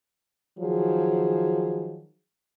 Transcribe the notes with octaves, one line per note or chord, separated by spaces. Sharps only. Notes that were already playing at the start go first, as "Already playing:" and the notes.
D#3 F3 F#3 G#4